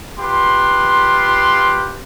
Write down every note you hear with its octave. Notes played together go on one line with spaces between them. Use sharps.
F4 G4 B4 C6